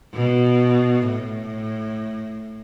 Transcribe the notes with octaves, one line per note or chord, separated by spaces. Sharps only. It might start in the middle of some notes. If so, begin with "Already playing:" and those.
B2
A2